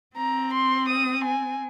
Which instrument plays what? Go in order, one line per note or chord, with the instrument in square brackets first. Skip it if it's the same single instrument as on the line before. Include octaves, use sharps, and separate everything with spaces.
[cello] C4 [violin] A#5
[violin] C6
D#6
G#5